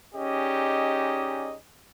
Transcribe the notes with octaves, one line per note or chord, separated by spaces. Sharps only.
C#4 D#4 G4 G#4 D5 D#5